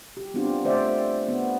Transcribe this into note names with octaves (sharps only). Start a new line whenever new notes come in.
G4
B3 C4 D4 F4 G4
A3 C5 D5 E5
B3